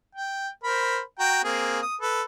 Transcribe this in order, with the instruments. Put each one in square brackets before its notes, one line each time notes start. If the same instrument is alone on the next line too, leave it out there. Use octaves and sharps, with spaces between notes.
[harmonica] G5
A#4 C5 B5
F#4 G5 A#5
A#3 C4 G#4
D#6
A4 B4